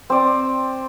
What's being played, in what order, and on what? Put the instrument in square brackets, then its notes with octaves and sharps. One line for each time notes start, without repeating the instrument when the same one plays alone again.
[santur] C4 D5